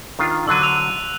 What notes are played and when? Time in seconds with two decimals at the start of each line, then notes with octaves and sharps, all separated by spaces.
0.19 D#3 D4 F4
0.48 D3 F#3 D4 E6 F#6 D#7
0.63 F7